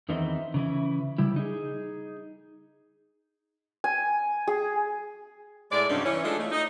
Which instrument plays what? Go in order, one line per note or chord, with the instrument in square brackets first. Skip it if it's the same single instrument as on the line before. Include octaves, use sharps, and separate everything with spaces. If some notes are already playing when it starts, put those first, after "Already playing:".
[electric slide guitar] E2 D#3 E3 C4 D#4 E4
C#3 E3 E4
C#3 G3 E4
D#4 G#4
[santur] G#5
G#4
[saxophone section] A2 G#3 E4 D5
G2 C3 F#3 G#3 C#4 D#4
E3 C#4
G#3 A3 D4 D#4 F4 A4
A3
D#4